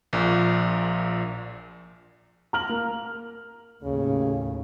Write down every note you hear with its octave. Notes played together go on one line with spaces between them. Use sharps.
A#1 A#2
A#5 F6 F#7
A#3
D#2 A2 C#3